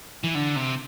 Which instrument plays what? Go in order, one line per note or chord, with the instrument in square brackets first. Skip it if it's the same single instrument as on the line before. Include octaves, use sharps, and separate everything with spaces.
[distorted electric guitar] E3
D3
C3